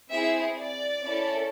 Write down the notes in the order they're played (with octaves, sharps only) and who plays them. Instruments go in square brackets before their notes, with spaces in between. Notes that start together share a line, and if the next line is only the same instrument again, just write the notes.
[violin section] C4 E4 G#4 E5
D5
C#4 E4 A4